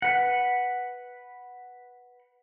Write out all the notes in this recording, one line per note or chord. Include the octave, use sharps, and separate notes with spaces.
B4 F#5